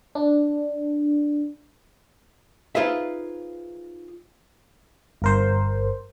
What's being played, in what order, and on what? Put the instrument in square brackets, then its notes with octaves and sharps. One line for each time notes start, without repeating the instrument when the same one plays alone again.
[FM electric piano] D4
[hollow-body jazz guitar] D#4 F4 G#4 B4 C5 E5
[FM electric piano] G1 A#4 C5